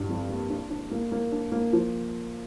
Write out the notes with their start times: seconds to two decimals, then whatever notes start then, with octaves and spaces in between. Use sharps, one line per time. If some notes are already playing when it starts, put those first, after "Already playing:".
Already playing: G2
0.09 F2
0.29 A#3
0.49 D4
0.70 D4
0.91 A#3
1.12 A#3
1.32 D4
1.52 A#3
1.73 F3